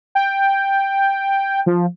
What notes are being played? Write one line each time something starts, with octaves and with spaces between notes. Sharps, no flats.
G5
F3